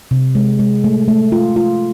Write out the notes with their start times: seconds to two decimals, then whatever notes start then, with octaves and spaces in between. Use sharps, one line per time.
0.11 C3
0.35 G#3
0.59 G#3
0.84 A3
1.08 A3
1.32 F4
1.56 F4